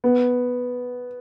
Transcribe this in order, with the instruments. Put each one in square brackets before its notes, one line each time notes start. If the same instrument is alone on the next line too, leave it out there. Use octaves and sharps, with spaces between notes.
[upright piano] B3